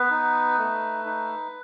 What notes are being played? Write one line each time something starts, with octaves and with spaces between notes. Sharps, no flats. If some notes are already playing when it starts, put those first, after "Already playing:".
Already playing: B3 B4
D#4
A3
D#4